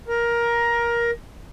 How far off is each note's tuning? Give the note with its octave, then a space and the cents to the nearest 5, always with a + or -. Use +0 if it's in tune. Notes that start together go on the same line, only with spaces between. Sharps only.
A#4 +15